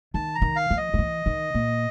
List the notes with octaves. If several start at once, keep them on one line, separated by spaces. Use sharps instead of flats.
D#3 A5
A#5
D#3
F5
F3
D#5
F3
E3
D#3
A#2